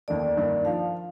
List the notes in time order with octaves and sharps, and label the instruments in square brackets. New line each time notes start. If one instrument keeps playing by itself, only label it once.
[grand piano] D#2 D#3 A3 [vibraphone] D5
[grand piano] G2 D#3 A#3
[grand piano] F3 [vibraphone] F5